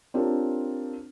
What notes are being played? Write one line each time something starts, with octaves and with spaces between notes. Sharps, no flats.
C4 D4 F4 G4 A#4 C#5